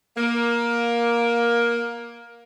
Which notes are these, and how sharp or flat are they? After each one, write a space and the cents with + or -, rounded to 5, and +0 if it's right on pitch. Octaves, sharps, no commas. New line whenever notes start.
A#3 +15